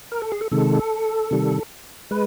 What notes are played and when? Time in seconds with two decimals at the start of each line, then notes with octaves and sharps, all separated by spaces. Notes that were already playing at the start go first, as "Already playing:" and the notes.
0.12 A#4
0.22 A4
0.32 G#4
0.41 A4
0.52 C3 D#3 G#3 A4
1.31 C3 D#3 G3
2.11 G#3 B4